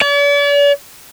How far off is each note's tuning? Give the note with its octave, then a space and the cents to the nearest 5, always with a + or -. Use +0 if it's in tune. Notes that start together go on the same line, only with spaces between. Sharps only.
D5 -45